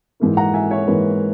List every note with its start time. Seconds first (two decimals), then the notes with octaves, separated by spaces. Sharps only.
0.20 G#2 E3 A#3
0.37 F#5 A#5
0.54 E5 G#5
0.71 C#5 E5
0.87 G#2 E3 A#3 B4